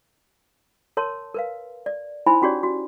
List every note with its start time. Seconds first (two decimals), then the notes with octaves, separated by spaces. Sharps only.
0.97 A#4 C#5 A5 C6
1.35 A#4 B4 F5
1.86 D5
2.26 D#4 E4 C5 G#5 B5 C6
2.42 C#4 F#4 G4 C#5 D5
2.63 F#4